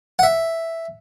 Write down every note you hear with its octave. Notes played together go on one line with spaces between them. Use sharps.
F#5
E5